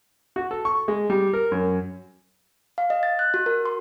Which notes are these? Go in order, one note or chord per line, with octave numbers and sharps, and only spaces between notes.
F#4
A4
C#6
G#3
G3
A#4
F#2
F5
D#5
A6
F#6
F#4
A#4
C6